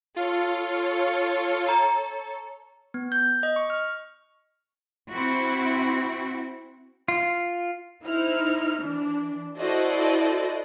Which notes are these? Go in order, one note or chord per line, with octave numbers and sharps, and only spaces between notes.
F4 A4 C#5
A#5
B3
G6
D#5
C#6
F6
C4 E4 F#4
F4
D#4 E4 C5 F6
E3 D4
E4 F#4 A4 C5 D5 D#5